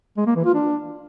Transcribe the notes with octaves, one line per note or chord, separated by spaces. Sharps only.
G#3
A#3
E3
F4
D4